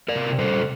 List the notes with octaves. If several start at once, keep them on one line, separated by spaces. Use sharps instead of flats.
A#4 D5
C3
G3 A4 C5